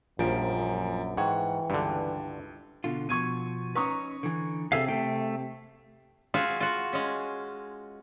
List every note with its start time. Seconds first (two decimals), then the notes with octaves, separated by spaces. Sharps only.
0.19 A#1 F#2 F3 G3 G#5 A#5 D7
1.17 G#2 E3 F#5 G5 C#6 G#6
1.70 C#2 G2 D3
2.84 B2 D3 F4
3.09 B2 F3 C#6 G#6 D#7
3.76 C#4 D#4 B4 A#5 C#6 D#6
4.23 D3 E3
4.72 C3 G#4 A4 C#5 E5 F5 G#5
4.88 C3 A3 G5
6.34 F4 F#4 G#4 E5 F5
6.60 F4 F#4
6.93 G#3 C#4